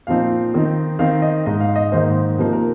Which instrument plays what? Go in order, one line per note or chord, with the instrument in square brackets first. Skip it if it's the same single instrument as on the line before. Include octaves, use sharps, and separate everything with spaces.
[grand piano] A#2 F3 C4 D#4 F5
D#3 C4 D#4
D#3 C4 D#4 F5
D#5
G#2 G#3 D#4 D#5
F5
D#5
G#2 D#3 A#3 D#4 C5
C3 F3 A#3 D#4
A#4